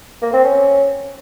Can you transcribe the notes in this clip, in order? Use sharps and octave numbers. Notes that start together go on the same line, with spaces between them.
A#3
C4
C#4